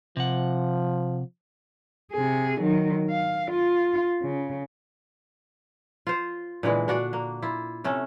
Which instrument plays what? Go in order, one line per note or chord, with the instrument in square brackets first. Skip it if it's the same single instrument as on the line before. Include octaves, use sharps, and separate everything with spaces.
[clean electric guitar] C3 F#5 [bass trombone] F3
[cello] C3 G#4
D#3 F#3
F5
F4
C#3
[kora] F4 C5
A#2 D3 E3 G#3
D4 F#4 D5
A#3
E4 F4
C3 A3 C#4